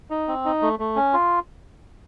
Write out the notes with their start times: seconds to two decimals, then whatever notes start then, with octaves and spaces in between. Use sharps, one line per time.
0.10 D#4
0.28 C4
0.45 D#4
0.62 A3
0.79 A3
0.96 C#4
1.14 F4